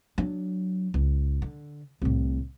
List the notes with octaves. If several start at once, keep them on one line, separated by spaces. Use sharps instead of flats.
F#3 D4
C#2
D3
C2 A2